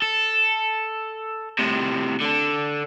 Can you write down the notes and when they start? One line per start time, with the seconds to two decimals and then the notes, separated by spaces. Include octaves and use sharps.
0.02 A4
1.59 A2 C3
2.22 D3 D4